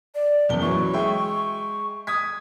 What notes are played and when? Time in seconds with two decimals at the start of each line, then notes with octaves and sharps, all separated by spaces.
0.15 D5
0.49 F#1 E2 G7
0.62 E3 F#3 C#6
0.93 G#3 E5 G5
2.07 D#6 G#6 B6